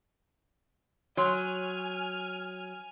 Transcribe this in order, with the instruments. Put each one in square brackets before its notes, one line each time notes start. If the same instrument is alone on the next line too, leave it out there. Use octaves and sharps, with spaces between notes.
[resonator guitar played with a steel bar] F#3 [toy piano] C#5 C6 [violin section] G#5 F6